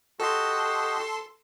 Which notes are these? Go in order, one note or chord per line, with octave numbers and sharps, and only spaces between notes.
F#4 G4 A4 D#5 C6